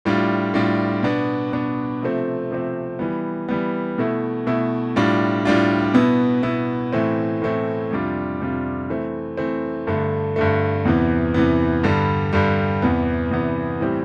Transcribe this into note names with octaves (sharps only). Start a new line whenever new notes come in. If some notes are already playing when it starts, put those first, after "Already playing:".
A2 G3 D4 F4
A2 G3 D4 F4
B2 B3 D4
B2 B3 D4
C3 F3 A3 C4
C3 F3 A3 C4
E3 G3 B3
E3 G3 B3
B2 A3 E4
B2 A3 E4
A2 G3 D4 F4
A2 G3 D4 F4
B2 B3 E4
B2 B3 E4
A2 E3 A3 C4
A2 E3 A3 C4
F2 C3 G3 D4 F4
F2 C3 G3 D4 F4
E3 A3 C4
E3 A3 C4
G2 D3 A3
G2 D3 A3
E2 C3 E3 B3
E2 C3 E3 B3
G2 D3 G3
G2 D3 G3
E2 C3 E3 B3
E2 C3 E3 B3
A2 E3 G3 C4 G4